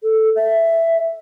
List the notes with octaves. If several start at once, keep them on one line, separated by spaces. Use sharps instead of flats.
A4
E5